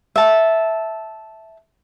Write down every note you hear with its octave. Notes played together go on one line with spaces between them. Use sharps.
E5 A5